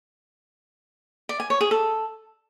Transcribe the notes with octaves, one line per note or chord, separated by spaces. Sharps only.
D5
G#5
C#5
G#4
A4